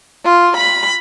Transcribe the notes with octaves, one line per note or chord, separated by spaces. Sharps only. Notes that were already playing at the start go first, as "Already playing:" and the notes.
F4
B5